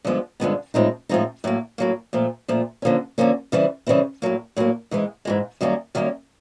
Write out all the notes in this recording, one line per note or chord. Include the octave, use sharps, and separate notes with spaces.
G2 D3 F3 G#3 B3
G2 D3 F3 G#3 B3
A2 F3 G#3 C4 D#4
A2 F3 G#3 C4 D#4
A2 F#3 A#3
A2 F#3 A#3
A#2 F3 A3
A#2 F3 A3
D3 F3 A#3 C#4
D3 F3 A#3 C#4
C#3 E3 G3 C4 E4
C#3 E3 G3 C4 E4
A2 F#3 A#3
A2 F#3 A#3
G#2 E3 G#3
G#2 E3 G#3
F#2 D#3 G3 A#3 C#4
F#2 D#3 G3 A#3 C#4